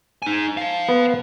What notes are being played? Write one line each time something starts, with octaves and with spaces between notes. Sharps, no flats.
D#4 G#5
C5 F5
B3